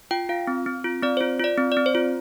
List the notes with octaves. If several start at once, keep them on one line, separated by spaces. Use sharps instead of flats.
F4 G5
F4 F5
C4
C4
F4
C4 D5
C5
F4
F4 D5
C4
D5
C4
C5
F4